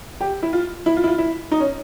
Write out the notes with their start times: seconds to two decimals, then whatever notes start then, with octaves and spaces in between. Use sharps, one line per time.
0.20 G4
0.43 E4
0.53 F4
0.86 E4
0.97 F4
1.04 E4
1.07 F4
1.18 E4
1.51 D#4
1.60 C#4